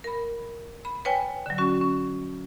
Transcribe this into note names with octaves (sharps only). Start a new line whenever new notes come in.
A#4 B5
B5
B4 C#5 G5 G#5
D3 F#3
C#4 F#4
C#4